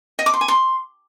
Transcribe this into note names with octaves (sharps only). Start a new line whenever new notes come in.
D#5
D6
C6
G#5
C6